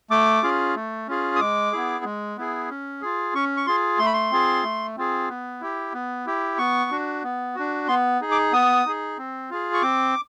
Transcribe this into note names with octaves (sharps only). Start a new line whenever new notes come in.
A3 D6
C#4 F4 G#4
A3
C#4 F4 G#4
D#6
G#3 D6
B3 E4 G#4
G#3
B3 E4 G#4
C#4
F4 G#4
C#4 C#6
C#6
F4 G#4 C6
A3 C6
B5
C6
C4 F4 G#4
A3
C4 F4 G#4
B3
E4 G4
B3
E4 G4
B3 C#6
D4 F#4
B3
D4 F#4
B3 C6
D#4 G#4
D6
B3 D#6
D#4 G#4
C4
F4 G#4
C#6
C4 D6